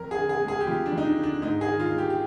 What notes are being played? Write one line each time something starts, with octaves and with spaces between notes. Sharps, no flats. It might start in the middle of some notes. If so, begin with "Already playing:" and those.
Already playing: F2 A#4
G#4
D3
G#4
G#3
G#4
G4
F2 F4
D4
F2
D#4
D4
D3
D4
G#2 D#4
G#4
D#3
F4
G#3
G4
G4